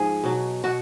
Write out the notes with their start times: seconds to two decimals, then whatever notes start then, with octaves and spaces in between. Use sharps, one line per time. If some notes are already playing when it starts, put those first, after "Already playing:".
Already playing: G#2 F3 G#4
0.24 B2 F#3
0.64 B2 F#4